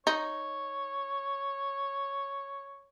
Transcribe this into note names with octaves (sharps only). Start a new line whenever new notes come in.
D#4 C#5